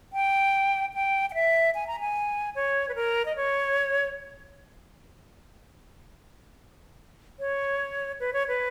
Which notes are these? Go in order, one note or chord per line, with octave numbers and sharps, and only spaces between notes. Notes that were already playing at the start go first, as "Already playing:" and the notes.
G5
G5
G5
E5
G#5
A#5
G#5
C#5
B4
A#4
D#5
C#5
C#5
B4
C#5
B4